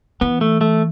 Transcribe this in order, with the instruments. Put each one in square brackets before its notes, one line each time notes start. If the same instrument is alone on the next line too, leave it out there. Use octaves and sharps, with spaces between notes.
[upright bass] E3 [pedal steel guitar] B3
[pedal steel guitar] A3
A3